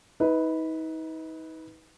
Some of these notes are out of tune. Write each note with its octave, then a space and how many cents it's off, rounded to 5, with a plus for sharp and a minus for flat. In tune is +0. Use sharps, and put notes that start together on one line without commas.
D#4 +40 B4 +0